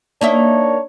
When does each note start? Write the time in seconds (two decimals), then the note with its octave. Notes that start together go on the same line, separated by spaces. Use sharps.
0.21 A#3 D4 D#4 C#5 E5